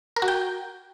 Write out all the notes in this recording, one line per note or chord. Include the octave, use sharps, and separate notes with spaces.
A#4
F#4
G5